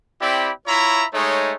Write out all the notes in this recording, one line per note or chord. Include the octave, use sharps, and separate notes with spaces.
C4 E4 G4 D5 G5 B5
E4 F4 C#5 E5 A#5 B5
G#3 A3 D#4 C#5